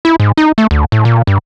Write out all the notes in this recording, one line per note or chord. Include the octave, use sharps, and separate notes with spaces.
E4
G#2
D#4
A3
D2
A2
A#2
G2